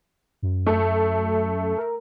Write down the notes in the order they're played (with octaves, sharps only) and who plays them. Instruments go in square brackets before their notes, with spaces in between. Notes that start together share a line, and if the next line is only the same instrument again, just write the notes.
[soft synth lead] F#2
[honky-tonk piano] A3
[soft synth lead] A#4